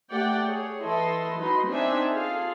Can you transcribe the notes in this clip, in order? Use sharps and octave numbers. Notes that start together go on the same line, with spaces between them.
A3 G4 D5 F#5 G5
G#4 C#5
E3 E4 A4 D#5 C6
F#3 D#4 B4 D#5 C6
C4 D4 D#4 E5 G#5
F4 G#4 A4 F5